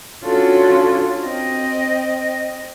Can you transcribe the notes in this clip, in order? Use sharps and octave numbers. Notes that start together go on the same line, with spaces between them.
C#4 D4 F4 F#4 A4 C#5
C4 D#5